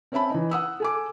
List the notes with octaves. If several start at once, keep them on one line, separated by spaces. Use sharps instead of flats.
C4 C#4 E5 A5 B5
E3 D#4
F#5 D#6 E6
A4 G#5 D6